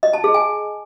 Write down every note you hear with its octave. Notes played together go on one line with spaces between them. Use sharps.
D#5
A5
G#4
G#5